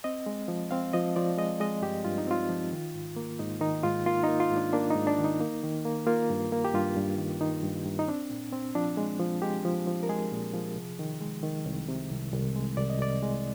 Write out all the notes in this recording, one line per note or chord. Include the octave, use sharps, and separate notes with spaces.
C4 D#5
G#3
F3
C4 F5
F3 D#5
F3 D5
G#3 D#5
G#3 D#5
G2 G4
G2 F4
D#4
C4 F4
F3
D#3
G#2
A#3
G#2 D#4
D#3 D#4
G#2 F4
A#3 F4
A#3 D#4
F4
G#2
D4
A#3 D4
G#2 D#4
D4
D#3
D#4
A#3
D#3
A#3
A#3 F4
G2
A#3
G4
G2 F4
G2
D#3
D#3 D#4
G2
G2
D#4
C4 D4
A#2
C4
F3 D4
G#3
F3
G#3 G4
F3
F3
A#4
G#3 G#4
A#2
F3
C3
D#3
G#3
D#3
C2
C3
C2
C2
G#3
C2 D5
D#5
C2 D5
G#3